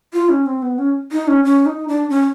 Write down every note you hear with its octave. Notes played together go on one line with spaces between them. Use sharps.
F4
C#4
C4
B3
C#4
D#4
C#4
C#4
D#4
D4
C#4